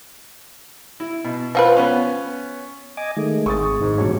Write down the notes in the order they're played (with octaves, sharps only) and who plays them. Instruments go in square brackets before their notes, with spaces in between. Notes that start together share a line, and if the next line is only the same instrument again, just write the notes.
[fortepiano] E4
B2
[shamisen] F3 F4 B4
[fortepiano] B3 C#4
[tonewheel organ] D#5 G#5 D6
D#3 G#3 A3
[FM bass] G#1 [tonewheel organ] G#4 [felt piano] C#6 D#6 A6
[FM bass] G#2
[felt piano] E2 G2 B2 [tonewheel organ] C#4 C#5